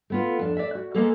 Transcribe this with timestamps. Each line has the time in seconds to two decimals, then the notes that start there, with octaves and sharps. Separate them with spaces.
0.10 A3 B3 F4
0.39 F2 D4
0.57 D5 E5
0.75 F#4
0.94 G#3 A#3 B3 A4